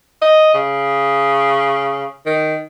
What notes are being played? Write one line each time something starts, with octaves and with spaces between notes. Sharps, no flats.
D#5
C#3
D#3